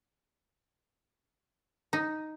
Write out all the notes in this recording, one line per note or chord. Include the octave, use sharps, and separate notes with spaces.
D#4